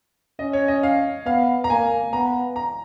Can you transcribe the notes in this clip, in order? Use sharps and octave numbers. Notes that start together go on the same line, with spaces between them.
C#4 D#5
C#5
D#5
F5
B3 F5
A#5
A#3 G#5
B3 A#5
A#5